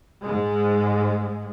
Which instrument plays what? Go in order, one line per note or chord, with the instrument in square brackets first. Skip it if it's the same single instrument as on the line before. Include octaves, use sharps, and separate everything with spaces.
[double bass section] G#2 G#3